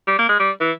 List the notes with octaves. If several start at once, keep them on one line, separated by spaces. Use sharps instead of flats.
G3
A#3
G#3
G3
E3